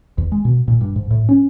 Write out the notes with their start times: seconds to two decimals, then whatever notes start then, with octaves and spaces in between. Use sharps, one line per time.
0.18 E2
0.32 G#3
0.45 B2
0.68 A#2
0.81 G2
0.96 G#2
1.11 A2
1.29 C#4